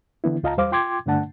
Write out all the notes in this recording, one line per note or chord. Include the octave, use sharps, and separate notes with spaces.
D3 E3 B3 E4
C#2 F4 D#5 F5 A5 A#5
E2 G3 C5 F5 D6
F4 G5 C6 D6 G#6
G2 D3 A3 D4 F#5 A5